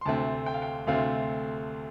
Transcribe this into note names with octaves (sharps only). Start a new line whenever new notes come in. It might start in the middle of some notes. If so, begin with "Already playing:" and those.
C6
D2 C3 A3 C4 A5
G5
F5
G5
D2 C3 A3 C4 F5